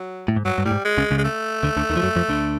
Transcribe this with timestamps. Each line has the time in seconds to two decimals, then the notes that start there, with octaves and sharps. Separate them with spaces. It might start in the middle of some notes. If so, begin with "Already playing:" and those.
Already playing: F#3
0.28 A2
0.36 G#2
0.45 G2 F#3
0.58 G2
0.65 A2 G3
0.71 G#2
0.85 G#3
0.98 C#2 C#3
1.11 C#2 C#3
1.18 G#3
1.24 A3
1.63 D2 D3
1.77 D2 D3
1.90 D#2 D#3
1.97 F3
2.03 F#2 F#3
2.16 F2 F3
2.29 D2 D3